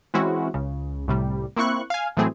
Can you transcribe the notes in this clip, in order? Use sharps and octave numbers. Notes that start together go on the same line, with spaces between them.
E3 G#3 C4 C#4 E4 F#4
C#2 C#3
C2 A2 C3 G3
A#3 C4 E4 C#6 F#6
F5 G#5
A2 E3 F#3 A3 C4 G#4